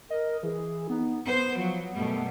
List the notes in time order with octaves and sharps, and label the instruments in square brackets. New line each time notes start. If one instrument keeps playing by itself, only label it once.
[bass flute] A#4 [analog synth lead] D#5
[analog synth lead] E3 [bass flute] G#4
[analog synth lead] B3 [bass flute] D#4
[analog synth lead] B3 [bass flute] B4 [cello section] C5
[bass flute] F3 [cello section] F#3
[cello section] F#2 B2 G3 [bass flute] A3